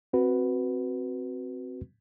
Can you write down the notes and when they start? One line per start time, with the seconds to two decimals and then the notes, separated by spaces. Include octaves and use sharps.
0.13 C4 F#4 B4